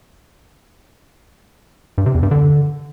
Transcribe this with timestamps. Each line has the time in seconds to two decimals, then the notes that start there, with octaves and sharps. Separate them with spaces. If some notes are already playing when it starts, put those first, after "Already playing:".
1.98 G2
2.06 C3
2.14 E2
2.23 G2
2.31 D3